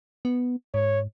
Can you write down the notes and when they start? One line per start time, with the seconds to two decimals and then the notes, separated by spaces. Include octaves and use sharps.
0.25 B3
0.74 G#2 C#5